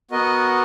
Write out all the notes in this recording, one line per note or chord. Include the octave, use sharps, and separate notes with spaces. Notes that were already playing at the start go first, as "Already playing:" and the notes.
B3 F#4 A#4 D#5